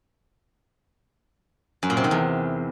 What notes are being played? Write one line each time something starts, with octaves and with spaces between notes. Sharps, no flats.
F#2
A#2
C3
D#3
E2